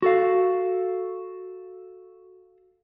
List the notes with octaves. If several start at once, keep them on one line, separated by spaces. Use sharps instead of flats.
F#4 A4 F5